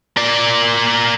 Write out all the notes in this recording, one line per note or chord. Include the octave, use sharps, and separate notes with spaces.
A#3 D5